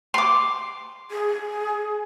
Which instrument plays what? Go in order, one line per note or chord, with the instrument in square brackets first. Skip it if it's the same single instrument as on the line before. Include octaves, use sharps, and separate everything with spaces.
[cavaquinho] C6 D6
[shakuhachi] G#4